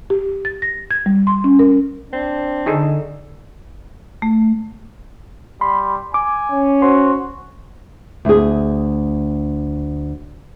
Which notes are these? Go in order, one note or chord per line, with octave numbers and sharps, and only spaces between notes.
G4
A6
A#6
G#6
G3
C6
C#4
A#4
C4 D4
D3 D#4 G#4 A4
A3
G3 B5 C6
G#5 D6
C#4
F#4 C5 C6
D2 G#4